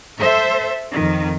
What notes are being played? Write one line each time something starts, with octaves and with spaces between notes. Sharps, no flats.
A4 C5 E5
F2 D#3